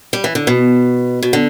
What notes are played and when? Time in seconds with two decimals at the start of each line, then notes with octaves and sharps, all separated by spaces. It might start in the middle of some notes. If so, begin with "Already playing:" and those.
0.13 G3
0.24 E3
0.35 D3
0.47 B2
1.23 B2
1.33 D3